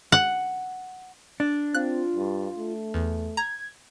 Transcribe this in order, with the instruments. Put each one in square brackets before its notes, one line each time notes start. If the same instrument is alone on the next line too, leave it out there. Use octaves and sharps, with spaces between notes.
[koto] F#5
[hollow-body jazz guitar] D4
[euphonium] C4 [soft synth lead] F4 [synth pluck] F#6
[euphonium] G2
A3
[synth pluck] E2
[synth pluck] A#5 [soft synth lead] G#6